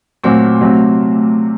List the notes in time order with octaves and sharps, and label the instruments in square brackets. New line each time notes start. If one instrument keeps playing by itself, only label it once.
[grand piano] A#2 F#3 C4 [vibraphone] A3
[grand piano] C3 F#3 C4